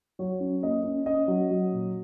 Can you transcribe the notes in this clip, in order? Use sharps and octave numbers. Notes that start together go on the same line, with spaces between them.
F#3 C#5
C#4
A#3 D#5
C#4
C#4 D#5
F#3
F#3
A#2